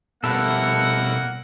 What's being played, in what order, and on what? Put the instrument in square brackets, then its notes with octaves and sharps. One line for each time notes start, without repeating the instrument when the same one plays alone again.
[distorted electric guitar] B2 G3 [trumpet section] A#3 F#5 [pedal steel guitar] E4 A4